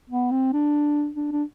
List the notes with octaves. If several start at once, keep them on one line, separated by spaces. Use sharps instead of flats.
B3
C4
D4
D4
D4